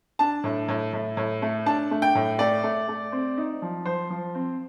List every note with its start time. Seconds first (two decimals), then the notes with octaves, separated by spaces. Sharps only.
0.19 D4 A5
0.44 A2
0.69 A2
0.93 A2
1.17 A2
1.42 A3
1.66 D4 A5
1.91 A3
2.02 G5
2.15 A2
2.39 A3 D5
2.63 A3
2.88 A3
3.12 C4
3.38 D#4
3.62 F3
3.85 F3 C5
4.10 F3
4.35 C4